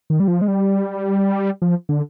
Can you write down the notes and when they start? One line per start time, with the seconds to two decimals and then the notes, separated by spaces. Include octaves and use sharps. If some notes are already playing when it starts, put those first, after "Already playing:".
0.10 D#3
0.20 G3
0.28 F3
0.42 G#3
0.48 G3
1.62 F3
1.89 D3